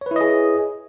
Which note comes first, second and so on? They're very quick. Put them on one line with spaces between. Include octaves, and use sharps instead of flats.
C#5 B4 E4 D#5 G#4